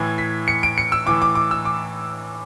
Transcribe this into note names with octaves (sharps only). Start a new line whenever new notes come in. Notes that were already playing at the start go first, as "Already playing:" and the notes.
Already playing: A2 E3 G#6
B6
C#7
D7
C#7
E6
A2 E3 D6
D6
D6
E6
D6